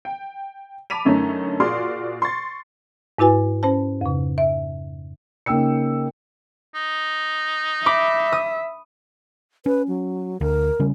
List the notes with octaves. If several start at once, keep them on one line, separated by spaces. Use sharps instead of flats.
G5
A5 B5 D6 B6 D#7 F7
F#2 D3 A3 C#4 D#4
A#2 F#4 G#4 D5 C6 F6
C6 C#6 A6
G#2 E4 F#4 B4 G#5
C#4 C5 A5
F2 C#3
E5
C#3 A#3 D#4 G5 E6 C#7
D#4
E5 B5 D6
D#6
C#4 B4
F#3
D2 A#4
C#3 G3 C#4